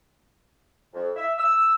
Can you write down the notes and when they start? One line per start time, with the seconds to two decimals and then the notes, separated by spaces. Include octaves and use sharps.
0.94 F2
1.16 E5
1.38 E6